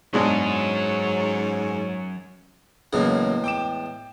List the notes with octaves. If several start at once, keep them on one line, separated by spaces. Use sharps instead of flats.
G#2 B2 F#3 G#3 C#4 D4 C#5
E2 A2 C#3 F#3 G#3 A#3
G5 D6 E7